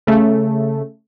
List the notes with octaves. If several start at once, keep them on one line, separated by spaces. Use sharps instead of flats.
C#3 A3